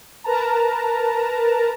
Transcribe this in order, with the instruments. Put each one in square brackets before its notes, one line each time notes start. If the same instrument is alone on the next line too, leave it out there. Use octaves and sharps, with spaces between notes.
[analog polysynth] A#4 B4 A5 A#5